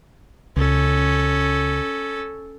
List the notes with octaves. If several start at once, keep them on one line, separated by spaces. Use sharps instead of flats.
C#2 C#4 A4